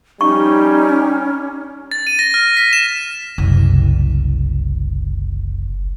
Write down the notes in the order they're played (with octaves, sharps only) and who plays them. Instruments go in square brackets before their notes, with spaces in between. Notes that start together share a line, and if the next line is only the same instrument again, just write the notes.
[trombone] G3 [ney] C#4 [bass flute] D#4 [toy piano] C#6
[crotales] A6
D#7
A#6
F6
B6
E7
[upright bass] F#1 C2